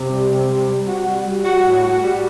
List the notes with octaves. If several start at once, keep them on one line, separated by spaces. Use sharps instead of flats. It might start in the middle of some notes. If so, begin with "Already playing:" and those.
Already playing: C3
G3
C3
G3
G3
F#4
G3
G3
F#4
A2
F#4
G3